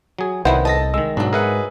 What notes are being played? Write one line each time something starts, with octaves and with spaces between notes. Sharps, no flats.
F#3 G#4
C2 D#3 F#3 B3 E4 C5 F#5
A4 D#5 A5 A#6
D#3 G#3 E6
B1 G#2 D#3 F#3 D4
G#4 A#4 B4 E5 F#5